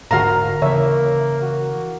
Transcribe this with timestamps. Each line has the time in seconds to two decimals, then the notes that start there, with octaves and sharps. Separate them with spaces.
0.11 D#1 G#2 D3 F#4 A#4 F5 A#5
0.62 C#3 E3 A#3 C#5 E5
1.42 F#4